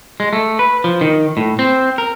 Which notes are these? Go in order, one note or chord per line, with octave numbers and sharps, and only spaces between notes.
G#3
A3
B4
F3
D#3
A2
C4
A#4